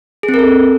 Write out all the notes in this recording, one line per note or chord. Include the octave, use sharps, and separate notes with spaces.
G#4
C4
A#4
A4